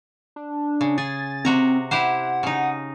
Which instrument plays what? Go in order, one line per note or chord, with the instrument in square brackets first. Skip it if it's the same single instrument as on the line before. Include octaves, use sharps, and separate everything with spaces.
[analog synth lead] D4
[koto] C#3
[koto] G#4 [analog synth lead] A6
[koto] C3 F#4 A#5 [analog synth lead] C4
[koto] E4 G4 C5 [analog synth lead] F#5
[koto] C#3 D#4